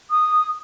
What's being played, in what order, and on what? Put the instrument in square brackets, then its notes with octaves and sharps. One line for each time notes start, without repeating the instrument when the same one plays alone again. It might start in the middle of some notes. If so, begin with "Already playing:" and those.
[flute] D#6